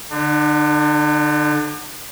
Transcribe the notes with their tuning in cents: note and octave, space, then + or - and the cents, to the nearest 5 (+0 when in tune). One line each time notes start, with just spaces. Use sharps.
D3 +0 D4 +45